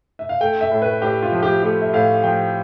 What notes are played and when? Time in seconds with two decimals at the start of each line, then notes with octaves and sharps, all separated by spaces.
0.19 E5
0.29 F5
0.41 A3 G5
0.61 E5
0.71 A2
0.82 B4
1.01 A2 G4
1.22 F4
1.32 F3
1.43 G4
1.62 A3 G4
1.81 E5
1.93 A2 F5
2.24 F3 G5